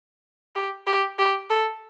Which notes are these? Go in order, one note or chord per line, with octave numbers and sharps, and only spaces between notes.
G4
G4
G4
A4